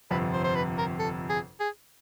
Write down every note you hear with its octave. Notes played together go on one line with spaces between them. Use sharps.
G1 F2 C3 F3 B4
C5
C5
B4
A#4
A4
G#4
G#4